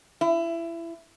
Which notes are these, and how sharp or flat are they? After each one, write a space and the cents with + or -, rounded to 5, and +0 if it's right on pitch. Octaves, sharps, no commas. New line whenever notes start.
E4 +25